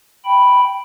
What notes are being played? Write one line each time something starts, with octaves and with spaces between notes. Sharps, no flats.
G5 B5